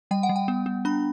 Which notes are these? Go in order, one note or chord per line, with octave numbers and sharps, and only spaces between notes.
G3 G5
F#5
G3
G5
B3
B3
D4 B5